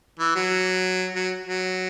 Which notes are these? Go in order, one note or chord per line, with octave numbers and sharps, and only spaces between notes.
E3
F#3
F#3
F#3